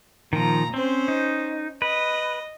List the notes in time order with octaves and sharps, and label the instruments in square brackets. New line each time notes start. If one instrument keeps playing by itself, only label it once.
[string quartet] A#2 A#5 [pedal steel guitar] D#3 F3
[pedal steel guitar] C4 [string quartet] C#4 C5
[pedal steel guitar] D#4
[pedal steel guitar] B4 [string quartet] D#5